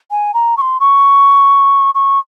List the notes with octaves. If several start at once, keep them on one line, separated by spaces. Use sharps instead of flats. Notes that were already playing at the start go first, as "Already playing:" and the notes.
G#5
A#5
C#6
C6
C#6
C#6